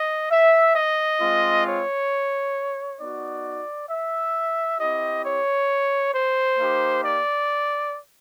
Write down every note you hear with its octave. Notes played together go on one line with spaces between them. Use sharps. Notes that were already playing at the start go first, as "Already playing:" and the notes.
Already playing: D#5
E5
D#5
G#3 C4 F4
C#5
B3 D#4 F#4 D5
E5
C4 E4 G4 D#5
C#5
C5
A#3 D#4 G4
D5